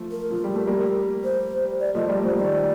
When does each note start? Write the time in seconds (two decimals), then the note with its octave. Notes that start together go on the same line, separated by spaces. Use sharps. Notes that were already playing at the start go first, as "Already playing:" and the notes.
Already playing: F3 A3
0.11 A#4
0.31 F3
0.44 G3
0.55 A3
0.67 G3 A#3
1.24 C5
1.80 D5
1.95 F3 A3 D#5
2.09 G3 A#3 D5
2.23 F3 A3 C5
2.37 D#3 G3 D5